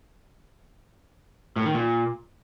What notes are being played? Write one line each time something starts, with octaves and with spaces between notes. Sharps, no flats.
A2
D#3
A#2